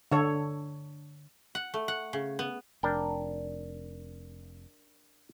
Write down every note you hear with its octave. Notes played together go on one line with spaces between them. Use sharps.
D3 A4 C#5
F#5
A3
F#5
C#3
B3
F1 D4 A#4 G5